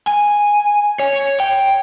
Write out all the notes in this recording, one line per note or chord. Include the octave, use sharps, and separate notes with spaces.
G#5
C#5
G5